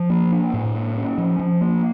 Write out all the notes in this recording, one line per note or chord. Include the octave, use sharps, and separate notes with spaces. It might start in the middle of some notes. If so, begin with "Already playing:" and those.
Already playing: F3
A#3
D4
A2
A#3
C#4
F3
F3
A#3